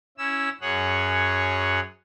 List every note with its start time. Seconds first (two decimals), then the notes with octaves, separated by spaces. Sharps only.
0.18 C#4 E4 E6
0.61 F#2 G#4 C#5 F#5